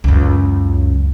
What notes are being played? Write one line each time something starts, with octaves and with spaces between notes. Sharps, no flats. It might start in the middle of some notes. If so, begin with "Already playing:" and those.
C#2 F#2